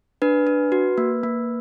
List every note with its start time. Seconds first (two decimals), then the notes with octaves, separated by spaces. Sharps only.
0.22 D4 B4
0.47 D4
0.72 F#4
0.98 A#3
1.23 A#3